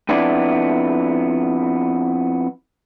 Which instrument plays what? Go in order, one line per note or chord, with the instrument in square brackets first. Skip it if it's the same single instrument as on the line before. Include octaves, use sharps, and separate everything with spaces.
[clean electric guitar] F2 B3 D4 E4 D5